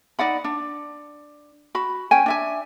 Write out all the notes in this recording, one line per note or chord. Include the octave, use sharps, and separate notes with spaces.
D#4 D5 F#5 B5
D4
F#4 B5
C#4 G5 G#5
D4 E5 G#5